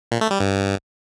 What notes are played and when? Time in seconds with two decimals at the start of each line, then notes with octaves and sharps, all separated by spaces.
0.12 A#2
0.21 A3
0.31 G3
0.40 G2